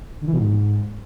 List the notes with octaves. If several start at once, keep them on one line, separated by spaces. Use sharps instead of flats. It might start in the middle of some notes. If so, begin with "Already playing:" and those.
D3
E3
B2
G#2